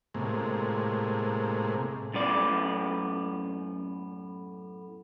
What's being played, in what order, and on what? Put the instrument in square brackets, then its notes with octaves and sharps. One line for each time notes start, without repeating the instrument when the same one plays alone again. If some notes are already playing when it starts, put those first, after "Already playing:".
[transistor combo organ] A2 C3 G#3 A#3
[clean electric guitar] F#2 A2 B3 D5